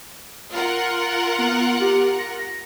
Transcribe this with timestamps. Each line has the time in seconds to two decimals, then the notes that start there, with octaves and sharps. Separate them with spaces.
0.52 F4 A#4 F#5
1.38 B3
1.80 G4
2.19 A#6